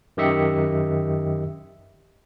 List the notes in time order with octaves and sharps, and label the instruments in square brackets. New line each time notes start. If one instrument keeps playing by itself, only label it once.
[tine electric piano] F#2 D#3 G4 D#5 E5 C#7